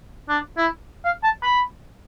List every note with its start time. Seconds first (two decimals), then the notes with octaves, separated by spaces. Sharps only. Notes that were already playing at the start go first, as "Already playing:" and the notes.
0.29 D4
0.57 E4
1.05 F5
1.23 A5
1.43 B5